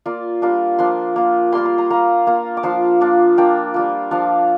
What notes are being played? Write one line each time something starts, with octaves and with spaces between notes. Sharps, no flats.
A#3 F4 D5
G3 A#3 D4 F4
F3 A#3 D4 C6
A#3 F4
G3 A#3 F4 C6
C6
A#5
A#3 F4 A#5
A#3 F4
D6
F3 D4 F4 C6
A#3 D4 F4
A#3 D4 F4 G5
G3 A#3 F4
F3 D4 F4 F5